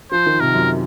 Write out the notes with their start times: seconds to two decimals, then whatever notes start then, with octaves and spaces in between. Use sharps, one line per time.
0.12 F3 C5
0.26 D#3
0.40 C3 A#4
0.54 F#2